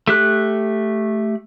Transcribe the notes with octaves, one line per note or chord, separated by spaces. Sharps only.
A3 G4 F#6